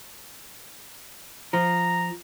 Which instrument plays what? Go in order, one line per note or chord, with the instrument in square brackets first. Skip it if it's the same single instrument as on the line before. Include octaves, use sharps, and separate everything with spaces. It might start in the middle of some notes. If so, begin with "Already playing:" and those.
[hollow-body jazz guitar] F3 [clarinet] A#5